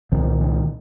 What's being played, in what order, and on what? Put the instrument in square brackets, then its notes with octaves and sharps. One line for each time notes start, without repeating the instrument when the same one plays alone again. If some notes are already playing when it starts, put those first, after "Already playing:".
[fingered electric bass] C2 A#2 D#3
D#3